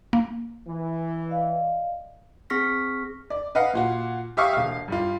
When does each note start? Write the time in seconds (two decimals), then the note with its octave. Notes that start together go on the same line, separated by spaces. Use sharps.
0.13 A#3
0.67 E3
1.28 D5 D#5 F5
2.50 C4 G#4 C#6 F6 A#6 B6
3.30 D5
3.55 B4 D#5 F5 F#5
3.74 A#2 F4 F#4
4.37 G4 E5 F5 C#6 D#6
4.53 E1 F5
4.88 G2 G3 F4